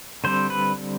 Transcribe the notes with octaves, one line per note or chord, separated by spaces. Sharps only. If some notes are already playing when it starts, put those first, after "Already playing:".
D3 G3 C4 C5
B4